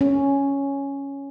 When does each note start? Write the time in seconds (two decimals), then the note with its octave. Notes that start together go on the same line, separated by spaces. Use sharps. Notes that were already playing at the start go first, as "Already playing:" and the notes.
0.01 C#4